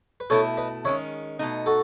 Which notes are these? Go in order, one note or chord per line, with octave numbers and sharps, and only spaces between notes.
B4
B2 A3 E4 A4 C#5
B4 D#5
D#3 G#3 C#4 C#5 E5
B2 A3 D#4
F#4 A4